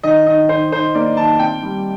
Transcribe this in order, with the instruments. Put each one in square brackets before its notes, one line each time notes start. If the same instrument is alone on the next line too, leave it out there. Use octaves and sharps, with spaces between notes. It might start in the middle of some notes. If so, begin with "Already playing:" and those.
[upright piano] D#3 D#5
D#3 D#5
D#3 C5
D#3 C5
A#3 D5
D#3 A5
C4 G5
G3